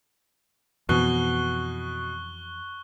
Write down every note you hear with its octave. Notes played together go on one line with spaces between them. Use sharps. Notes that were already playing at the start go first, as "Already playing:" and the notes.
F2 B2 E3 C#6 F#6 G7